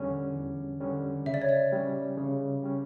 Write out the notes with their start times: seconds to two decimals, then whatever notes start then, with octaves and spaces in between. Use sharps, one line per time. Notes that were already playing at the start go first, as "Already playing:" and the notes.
Already playing: E2 D3 G3 C#4
0.34 E2
0.80 D3 G3 C#4
1.26 C#3 E5
1.34 D5
1.42 C#5
1.49 D5
1.73 G3 C#4
2.17 C#3
2.63 G3 C#4